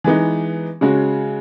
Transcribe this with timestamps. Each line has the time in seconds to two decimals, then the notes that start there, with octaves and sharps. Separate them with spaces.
0.04 E3 G#3 B3 D#4
0.81 C#3 G#3 C#4 F#4